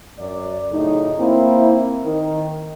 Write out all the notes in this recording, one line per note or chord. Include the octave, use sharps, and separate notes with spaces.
F#2 D5
F#2 A2 C#3 D#4
A#3 C4 E4
D#3